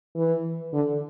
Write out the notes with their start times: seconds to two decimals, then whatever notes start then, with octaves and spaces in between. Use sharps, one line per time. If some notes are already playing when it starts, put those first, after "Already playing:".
0.16 E3
0.73 D3